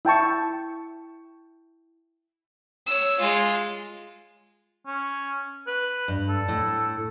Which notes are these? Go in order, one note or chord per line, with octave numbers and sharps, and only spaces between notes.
E4 G5 A5 C#6
C#5 E6
G#3 F4
C#4
B4
G2
A4
A2